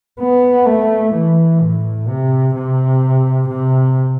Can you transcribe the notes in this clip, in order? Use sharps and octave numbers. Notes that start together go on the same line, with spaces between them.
B3
A3
E3
A2
C3
C3
C3